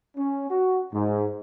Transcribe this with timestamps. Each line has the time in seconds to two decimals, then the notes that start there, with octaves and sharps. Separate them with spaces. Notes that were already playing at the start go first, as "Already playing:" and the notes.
0.17 C#4
0.50 F#4
0.93 G#2